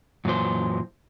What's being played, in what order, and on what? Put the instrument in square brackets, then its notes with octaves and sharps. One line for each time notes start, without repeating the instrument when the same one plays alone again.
[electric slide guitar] F#2 A#2 E3 F#3 C5